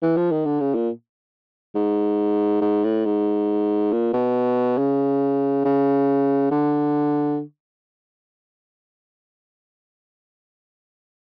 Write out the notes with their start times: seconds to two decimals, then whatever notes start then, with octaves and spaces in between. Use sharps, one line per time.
0.02 E3
0.17 F3
0.31 D#3
0.45 D3
0.60 C#3
0.75 A#2
1.75 G#2
2.61 G#2
2.84 A2
3.05 G#2
3.92 A#2
4.13 B2
4.78 C#3
5.65 C#3
6.51 D3